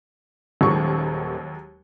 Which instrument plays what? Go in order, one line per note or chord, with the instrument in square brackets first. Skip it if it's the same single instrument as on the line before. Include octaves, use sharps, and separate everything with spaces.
[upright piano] D#1 D#3 C#6 [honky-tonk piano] D#2 F#3 G#3